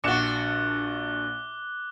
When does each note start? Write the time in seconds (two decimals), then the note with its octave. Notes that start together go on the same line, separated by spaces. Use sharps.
0.04 A#1 D4 F#4 D6 F#6 C#7 E7 G7